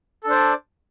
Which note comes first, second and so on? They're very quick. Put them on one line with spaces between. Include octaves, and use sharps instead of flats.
A4 D4 C5 D5